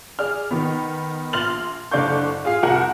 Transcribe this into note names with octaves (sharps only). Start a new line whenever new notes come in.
G#4 D5 F6
D#3 B3
A#1 C6 F6 A6 F7 F#7
F#1 D3 D5 F5 C#6 G6
F4 G#4 F5
C2 F2 F#4 A#4 F#5 F#7